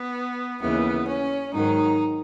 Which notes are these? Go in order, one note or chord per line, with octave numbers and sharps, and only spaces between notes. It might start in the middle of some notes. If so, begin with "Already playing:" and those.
Already playing: B3
D#2 C#3 E3 B3
C#4
G#2 D#3 F#3 D#4